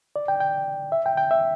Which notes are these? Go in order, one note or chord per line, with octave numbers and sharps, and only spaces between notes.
D5
G5
G5
E5
G5
G5
E5